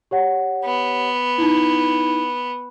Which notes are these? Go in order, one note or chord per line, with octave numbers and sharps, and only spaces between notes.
G4 C#5 F#5
B3
D#4 E4